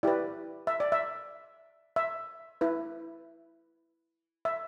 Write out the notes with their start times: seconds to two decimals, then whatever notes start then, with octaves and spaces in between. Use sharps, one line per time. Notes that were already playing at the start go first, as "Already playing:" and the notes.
0.03 E4 G4 B4 D5
0.67 E5
0.80 D5
0.92 E5
1.96 E5
2.61 E4 B4
4.45 E5